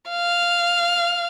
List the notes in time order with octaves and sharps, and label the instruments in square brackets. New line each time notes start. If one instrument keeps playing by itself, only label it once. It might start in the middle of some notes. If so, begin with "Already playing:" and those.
[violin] F5